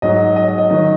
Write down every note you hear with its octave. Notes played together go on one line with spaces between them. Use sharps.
G#2 F#3 D#5
D#5
D#5
D#5
D#3 F#3 D#5